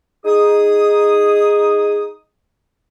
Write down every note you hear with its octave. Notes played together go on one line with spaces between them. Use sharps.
D#4 G#4 D#6